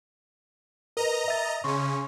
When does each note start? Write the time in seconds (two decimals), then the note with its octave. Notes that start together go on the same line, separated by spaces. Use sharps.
0.97 A#4 B4 D#5 A#5
1.28 E5 A6
1.64 C#3 C#4 C6 C#6